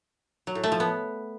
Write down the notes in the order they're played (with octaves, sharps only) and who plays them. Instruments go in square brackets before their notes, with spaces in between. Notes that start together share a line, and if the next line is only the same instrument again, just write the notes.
[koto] F#3
A2
A3
F3
B3